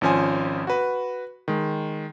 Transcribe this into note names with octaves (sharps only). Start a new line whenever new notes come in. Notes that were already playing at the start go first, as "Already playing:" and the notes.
G#1 F3 C#4 C5 G#5
F#4 B4
D#3 G#3